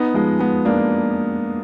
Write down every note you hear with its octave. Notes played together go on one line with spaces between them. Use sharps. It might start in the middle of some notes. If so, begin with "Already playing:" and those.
Already playing: B3 D#4
F3 G#3
G#3 B3
A#3 D4